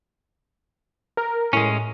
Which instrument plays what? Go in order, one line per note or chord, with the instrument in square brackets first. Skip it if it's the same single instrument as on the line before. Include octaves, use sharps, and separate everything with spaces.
[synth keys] A#4
[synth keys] A2 [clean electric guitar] G#3 C#4